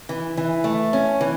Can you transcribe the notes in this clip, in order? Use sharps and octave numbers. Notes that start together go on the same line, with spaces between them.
E3
E3
A3
C#4
E3